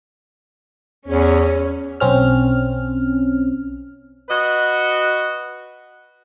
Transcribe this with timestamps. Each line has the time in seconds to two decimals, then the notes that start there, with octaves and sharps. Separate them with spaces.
1.08 E2 C#4
2.00 B1 C4 C#4 F6
4.29 F#4 B4 D#5